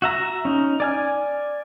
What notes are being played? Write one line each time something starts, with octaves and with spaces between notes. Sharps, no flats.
F#4 E5 A#5
C#4 D#4
D5 G#5 F6